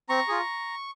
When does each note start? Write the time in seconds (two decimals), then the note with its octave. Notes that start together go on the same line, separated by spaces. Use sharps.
0.09 C4 A#5 C#6
0.28 F4 G#4